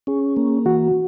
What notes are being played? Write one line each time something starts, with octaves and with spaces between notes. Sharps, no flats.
C#4 G#4
A#3
E3 F#4